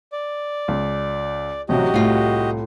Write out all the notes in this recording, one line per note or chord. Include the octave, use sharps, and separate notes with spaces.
D5
C#2
A1 C3 F#3 F#4 G4 D#5
C2 A2 F4